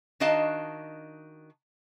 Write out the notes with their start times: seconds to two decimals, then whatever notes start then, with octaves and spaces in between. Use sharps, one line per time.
0.20 D#3 D4 F#4 D#5 F5 A5